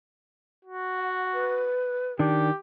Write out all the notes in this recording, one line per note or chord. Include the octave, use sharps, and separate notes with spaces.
F#4
F#5
B4
D#3 D4 G4